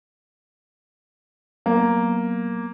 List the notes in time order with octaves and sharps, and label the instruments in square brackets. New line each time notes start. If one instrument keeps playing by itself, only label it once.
[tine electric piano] F#3 B3 [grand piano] A#3